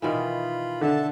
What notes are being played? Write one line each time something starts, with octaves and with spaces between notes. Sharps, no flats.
B2 D#3 E3 F4 B5
D3 A4 E5 A5